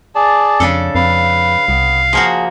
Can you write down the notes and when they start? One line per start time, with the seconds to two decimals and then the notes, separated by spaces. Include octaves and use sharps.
0.15 G#4 D5 A5
0.60 F2 C#3 D4 A4
0.95 F2 B4 F5
1.68 C2 B3
2.13 F3 A#3 F#4 G#4